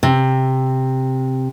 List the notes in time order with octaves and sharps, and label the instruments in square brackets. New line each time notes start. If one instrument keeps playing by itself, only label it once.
[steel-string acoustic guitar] C3